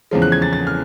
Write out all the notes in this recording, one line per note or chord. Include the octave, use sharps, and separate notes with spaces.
E2 C#3 F3 G#3
F#6
G#6
A6
A6
F6